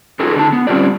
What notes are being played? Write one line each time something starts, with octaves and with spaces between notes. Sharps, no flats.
D#4 F4 F#4 G#4 A4
D3 D4 D#4 A5
B3
G3 C4 C#4 F4 G4 D5